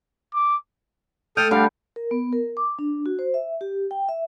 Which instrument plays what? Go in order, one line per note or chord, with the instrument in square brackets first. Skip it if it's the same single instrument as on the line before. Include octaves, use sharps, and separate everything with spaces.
[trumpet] D6
[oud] A3 [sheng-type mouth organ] A4 D#6 F6 [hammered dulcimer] G5
[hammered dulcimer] D3 G3 D4 [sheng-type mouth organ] F5
[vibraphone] A#4
B3
A#4
D6
D4
F#4
C5
E5
G4
G5
E5